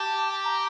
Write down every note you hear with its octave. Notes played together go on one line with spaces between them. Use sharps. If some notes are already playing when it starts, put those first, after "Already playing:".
Already playing: G4 A5
A#5